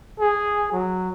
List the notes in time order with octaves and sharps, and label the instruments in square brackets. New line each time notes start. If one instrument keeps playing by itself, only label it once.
[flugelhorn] G#4
F#3